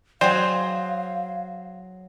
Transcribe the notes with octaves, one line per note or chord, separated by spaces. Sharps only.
F#3 G#4 C5 D5 F5 G5